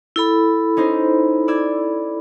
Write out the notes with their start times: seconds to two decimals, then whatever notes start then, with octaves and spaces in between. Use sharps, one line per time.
0.16 E4 A4 B5
0.77 C#4 D#4 C5
1.48 D5 E6 G#6